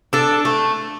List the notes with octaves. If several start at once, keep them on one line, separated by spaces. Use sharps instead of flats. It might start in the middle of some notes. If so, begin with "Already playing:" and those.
D4 A4
A3